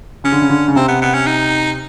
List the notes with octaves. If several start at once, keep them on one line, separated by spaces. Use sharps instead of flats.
C#3 C#4
D3
C#3
D3
C#3
C3 C4
B3
B3
C#4
D#4